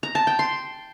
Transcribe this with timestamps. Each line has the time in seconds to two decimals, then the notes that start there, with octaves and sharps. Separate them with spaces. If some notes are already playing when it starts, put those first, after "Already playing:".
0.03 A#5
0.15 A5
0.27 G5
0.39 C6